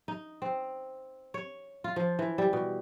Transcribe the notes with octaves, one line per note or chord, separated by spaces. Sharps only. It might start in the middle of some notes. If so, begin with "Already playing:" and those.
D#4
C4
C#5
F4
F3
E3
G3
B2